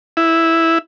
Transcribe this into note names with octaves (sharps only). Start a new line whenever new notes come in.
E4